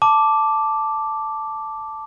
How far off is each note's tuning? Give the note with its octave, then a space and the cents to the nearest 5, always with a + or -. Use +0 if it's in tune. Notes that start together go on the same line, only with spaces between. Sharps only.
A5 +0 D6 +0